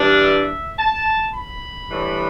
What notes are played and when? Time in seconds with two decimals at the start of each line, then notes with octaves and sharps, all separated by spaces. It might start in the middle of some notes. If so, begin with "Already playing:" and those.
Already playing: G2 E3 G3 D4
0.22 E5
0.78 A5
1.33 B5
1.89 A2 E3 G3 D4